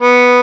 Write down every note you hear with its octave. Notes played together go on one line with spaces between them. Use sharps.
B3